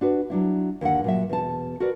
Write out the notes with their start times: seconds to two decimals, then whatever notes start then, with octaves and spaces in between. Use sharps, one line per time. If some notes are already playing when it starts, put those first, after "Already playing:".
0.01 D4 F#4 B4
0.30 F#3 D4 E4
0.81 D#2 D3 F#5
1.04 A#2 F#3 E5
1.29 E2 B2 A5
1.80 F#4 A#4 B4 D5